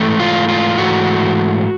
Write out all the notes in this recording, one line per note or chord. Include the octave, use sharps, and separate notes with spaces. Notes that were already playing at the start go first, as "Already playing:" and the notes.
Already playing: G#2 E3 A3
F4
F4
G#2 E3 A3 F#4